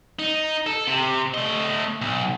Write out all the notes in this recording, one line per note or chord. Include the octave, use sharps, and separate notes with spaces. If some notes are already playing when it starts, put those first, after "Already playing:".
D#4
A4
C3
A3 D#5
B1